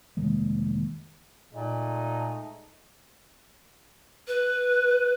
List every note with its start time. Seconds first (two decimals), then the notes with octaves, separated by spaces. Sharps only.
0.17 F1 D#3 G#3 A#3
1.54 A#2 G#3 A3 D#4
4.28 B4